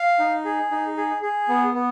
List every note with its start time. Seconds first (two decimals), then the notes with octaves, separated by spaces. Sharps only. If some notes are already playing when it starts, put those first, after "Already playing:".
Already playing: F5
0.19 D#4
0.45 G#4
0.71 D#4
0.97 G#4
1.22 G#4
1.48 B3
1.74 B3